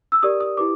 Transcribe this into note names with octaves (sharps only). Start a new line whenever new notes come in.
E6
G4 A#4 D5 D#6
D#6
E4 G4 B4 D6